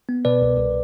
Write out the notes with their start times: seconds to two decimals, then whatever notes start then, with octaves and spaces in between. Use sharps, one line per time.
0.09 B3
0.25 B2 B4 D5
0.42 C2
0.58 C2